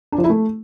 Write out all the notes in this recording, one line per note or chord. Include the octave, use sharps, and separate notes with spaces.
D4
F3
E4
A3